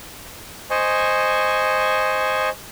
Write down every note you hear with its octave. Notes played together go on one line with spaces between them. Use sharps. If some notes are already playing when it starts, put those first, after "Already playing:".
C5 D#5 G#5 C#6